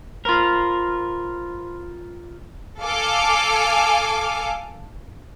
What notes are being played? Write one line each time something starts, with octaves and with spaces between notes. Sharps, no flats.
F4 A#4 C5 B5 C6
A4 F5 G#5 D6